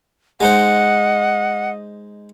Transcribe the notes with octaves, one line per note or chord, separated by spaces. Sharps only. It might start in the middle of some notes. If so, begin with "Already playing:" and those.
G#3 D#4 C5 D#5 F#5